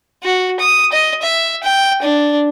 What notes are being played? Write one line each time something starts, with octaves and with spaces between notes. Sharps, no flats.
F#4
D#6
D#5
E5
G5
D4